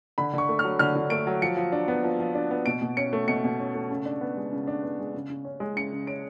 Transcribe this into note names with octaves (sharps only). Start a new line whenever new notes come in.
D3 B5
D3 C#6
A3
F6
F#3
D3 F6
D3
A3 D7
F#3
F3 C#7
F3
D4
B3
F3
F3
D4
B3
B2 D7
B2
C#4 C#7
A3
B2 C#7
B2
C#4
A3
C#3
D4
B3
G#3
C#3
D4
B3
G#3
C#3
C#3
C#4
G#3
C#3 C#7
C#3
C#4 D7